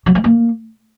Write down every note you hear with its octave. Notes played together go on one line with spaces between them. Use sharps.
F#3
G#3
A#3